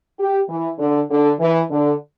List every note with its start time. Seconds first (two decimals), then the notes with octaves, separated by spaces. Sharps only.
0.19 G4
0.48 E3
0.78 D3
1.10 D3
1.40 E3
1.70 D3